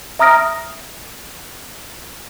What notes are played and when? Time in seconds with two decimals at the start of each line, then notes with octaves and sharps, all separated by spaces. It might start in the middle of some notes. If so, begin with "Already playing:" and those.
0.19 E5 A#5 D#6 F6 A#6 D7